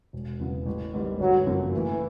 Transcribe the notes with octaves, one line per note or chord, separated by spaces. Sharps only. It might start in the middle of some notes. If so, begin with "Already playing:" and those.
E1
E2 C#3 F#3 B3
A1
G#2 D#3 G3 B3
G1 F#3
F#2 C#3 F3 A#3
A2 E3